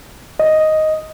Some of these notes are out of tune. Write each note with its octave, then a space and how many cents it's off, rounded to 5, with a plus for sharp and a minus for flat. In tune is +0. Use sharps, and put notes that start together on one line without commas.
D#5 +5